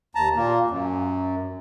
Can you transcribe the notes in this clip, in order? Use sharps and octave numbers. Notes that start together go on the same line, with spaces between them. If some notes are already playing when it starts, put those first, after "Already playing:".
D#2 A5 A#5
A#2 A#3
F#2